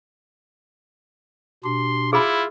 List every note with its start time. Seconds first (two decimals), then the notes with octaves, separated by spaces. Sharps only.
1.64 B2 D4 G4 C6
2.13 E4 F4 G#4 B5